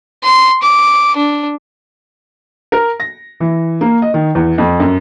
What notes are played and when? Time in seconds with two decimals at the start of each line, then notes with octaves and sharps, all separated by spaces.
0.24 C6
0.63 D6
1.17 D4
2.72 A#4
3.00 A#6
3.40 E3
3.81 A#3
4.02 D#5
4.14 D#3
4.35 E2
4.58 F2
4.80 F#2